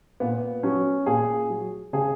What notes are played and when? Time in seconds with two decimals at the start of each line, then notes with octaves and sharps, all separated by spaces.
0.20 A#2 B3
0.63 F#3 C#4
1.06 A#2 G#4
1.50 F#3
1.93 C#3 G#4